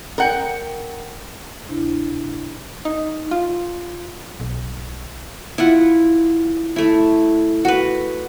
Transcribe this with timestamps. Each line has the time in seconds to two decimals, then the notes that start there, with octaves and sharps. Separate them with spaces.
0.18 A#4 F#5 G5
1.69 D2 C3 D4 E4
2.85 D#4
3.31 F4
4.40 B1
5.58 E4 F4 F#5
6.76 A3 E4
7.65 F#4 B4